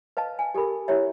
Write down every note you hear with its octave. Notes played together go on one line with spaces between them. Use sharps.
B4 D#5 F5 A5
G#5
G4 A4 A#4 B5
E4 G4 C#5 E5